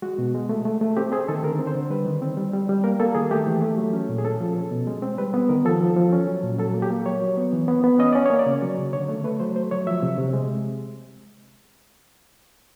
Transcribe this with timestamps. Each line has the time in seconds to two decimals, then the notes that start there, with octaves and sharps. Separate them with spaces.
0.02 G#3 F#4
0.19 B2
0.34 G#3
0.49 A3
0.65 A3
0.81 A3
0.97 C4 G4
1.12 C4 G#4
1.28 D#3 A4
1.43 D3 A#4
1.59 C4
1.67 C5
1.75 D3
1.90 G3 B4
2.06 D#3
2.22 C4
2.37 G3
2.53 G3
2.69 G3
2.84 A#3 A#4
3.00 A#3 A4
3.15 D#3 G#4
3.31 A3 G4
3.47 E3
3.62 A3
3.77 F#3
3.93 C#4
4.09 A#2
4.18 G#4
4.25 C#4 A4
4.41 F3
4.56 C#4
4.71 B2
4.87 G#3
5.02 C4
5.18 G3 B4
5.34 B3
5.49 D#3 A#4
5.65 F3 A4
5.81 F3
5.96 F3
6.13 C#4
6.28 F#3
6.43 A#2
6.58 F#3 A4
6.74 A#3
6.82 G4
6.90 A#3
7.06 F#3 C#5
7.22 F#3
7.37 B3
7.53 E3
7.68 B3
7.84 B3
7.99 C#4 D#5
8.13 C#4 D5
8.26 A#3 C#5
8.39 D5
8.46 C#3
8.62 F#3
8.78 C#3
8.93 D3 C#5
9.09 A3
9.24 A3 B4
9.40 F#3 C5
9.56 A3 C5
9.71 F#3 C#5
9.87 F3 E5
10.02 C3
10.18 C3
10.33 G#3